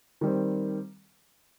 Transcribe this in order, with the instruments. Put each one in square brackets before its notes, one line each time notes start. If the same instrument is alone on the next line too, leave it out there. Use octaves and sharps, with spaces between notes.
[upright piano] D#3 G3 C4